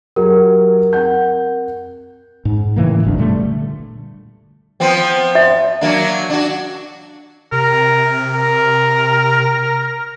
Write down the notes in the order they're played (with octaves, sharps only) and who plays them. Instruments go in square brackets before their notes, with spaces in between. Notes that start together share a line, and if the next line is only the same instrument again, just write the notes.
[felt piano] F#3 G4 G#4 [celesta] A#4
[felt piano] C4 F#5 G6
[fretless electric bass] G#2
A2 C#3 E3 A#3
F#1 B1 F2 D4
A#2 D3 G3 A3
[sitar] F3 B3 C4
[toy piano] E5
[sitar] F#3 A#3 D4
D4 F#4
[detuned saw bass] C3 [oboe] A#4
[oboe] A#4